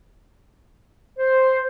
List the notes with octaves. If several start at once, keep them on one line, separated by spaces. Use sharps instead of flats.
C5